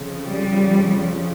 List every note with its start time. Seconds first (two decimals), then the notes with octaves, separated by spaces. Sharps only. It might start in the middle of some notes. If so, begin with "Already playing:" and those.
Already playing: F2 C#3
0.27 G3